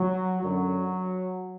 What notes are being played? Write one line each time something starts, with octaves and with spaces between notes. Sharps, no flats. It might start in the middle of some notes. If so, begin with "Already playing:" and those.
Already playing: F#3
F#2 D3 F#3